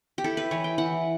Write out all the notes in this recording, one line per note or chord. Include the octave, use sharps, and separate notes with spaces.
G4
E4 A4
B4
E3 C#5
G5
E3 F#5